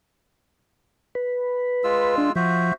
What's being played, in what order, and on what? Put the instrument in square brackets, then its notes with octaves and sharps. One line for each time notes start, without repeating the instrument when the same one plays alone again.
[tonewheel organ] B4
[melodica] G#3 F4 E6
[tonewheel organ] D4
[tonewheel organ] F3 [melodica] F#4 C5 E5